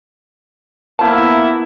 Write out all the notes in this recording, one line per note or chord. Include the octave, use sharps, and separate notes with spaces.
F3 A#3 B3 E4 A5